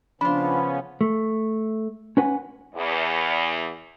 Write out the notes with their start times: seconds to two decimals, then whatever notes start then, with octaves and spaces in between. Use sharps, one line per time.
0.21 C#3 F3 B3 C#4 D4 F4 B5
1.01 A3
2.17 C#4 B4 F#5 G#5
2.75 E2